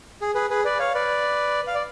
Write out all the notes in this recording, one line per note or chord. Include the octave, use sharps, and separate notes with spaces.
G#4
G#4 B4
G#4 B4
B4 D5
C#5 F5
B4 D5
F5
D5